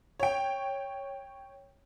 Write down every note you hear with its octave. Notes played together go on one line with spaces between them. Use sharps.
C#5 G5